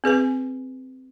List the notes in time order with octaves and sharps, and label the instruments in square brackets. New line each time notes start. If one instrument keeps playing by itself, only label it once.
[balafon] C4 G#4 B4 G#5